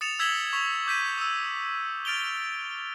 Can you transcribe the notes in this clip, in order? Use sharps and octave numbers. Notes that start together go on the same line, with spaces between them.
D#6 A6 C#7 E7 F7
E6 G#6 B6 E7 F#7 G7
C#6 B6 F7
D6 G6 B6 D#7
D#6 E6
F6 A6 D7 F7 G7